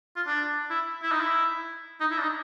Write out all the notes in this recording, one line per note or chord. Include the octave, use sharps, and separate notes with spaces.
F4
D4
E4
E4
D#4
E4
D#4
E4
D4
D#4